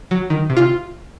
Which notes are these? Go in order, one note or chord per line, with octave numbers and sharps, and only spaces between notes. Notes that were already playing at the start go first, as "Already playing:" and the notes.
F#3
D#3
C3
F4